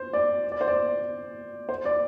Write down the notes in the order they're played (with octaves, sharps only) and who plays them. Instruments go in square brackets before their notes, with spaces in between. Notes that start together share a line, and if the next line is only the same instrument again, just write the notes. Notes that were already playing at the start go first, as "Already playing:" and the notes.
Already playing: [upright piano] C5
D5
D5
C5
D5
C5
D5